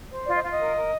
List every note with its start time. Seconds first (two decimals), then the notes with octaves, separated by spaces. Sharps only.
0.10 C5
0.26 F4 D5
0.35 D#5
0.43 F4 F5
0.52 D#5
0.59 A#4
0.76 A#4